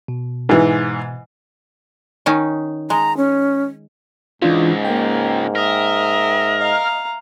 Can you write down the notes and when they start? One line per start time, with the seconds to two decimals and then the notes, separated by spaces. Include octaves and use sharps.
0.08 B2
0.49 G#2 E3
2.26 D#3 C#4 D#4
2.90 G#3 A#5
3.17 C#4
4.42 C#2 G#2 E3 D4 F4
4.85 A#3 G5
5.56 A#4 D#5 E5
6.61 D#5 F5 A#5